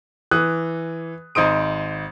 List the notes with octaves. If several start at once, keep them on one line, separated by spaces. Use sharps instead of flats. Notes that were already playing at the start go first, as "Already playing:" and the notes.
E3 D#6 F#6
G#1 D#4 C5 D#6 D7